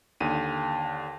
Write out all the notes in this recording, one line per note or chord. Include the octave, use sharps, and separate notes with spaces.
D#2 D3 D#7